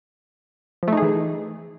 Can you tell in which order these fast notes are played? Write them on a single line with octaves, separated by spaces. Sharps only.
F3 A3 D#4 G#4 E3